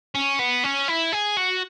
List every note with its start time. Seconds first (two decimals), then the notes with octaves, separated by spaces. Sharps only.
0.15 C#4
0.39 B3
0.64 C#4
0.88 E4
1.12 G#4
1.37 F#4